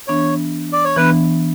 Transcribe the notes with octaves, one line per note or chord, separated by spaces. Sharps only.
E3 B3 D4 C#5
D5
C#5
E3 B3 D4 B4